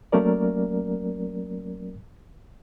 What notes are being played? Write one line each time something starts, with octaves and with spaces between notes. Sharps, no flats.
F#3 A3 A#3 C#4 A#4 D5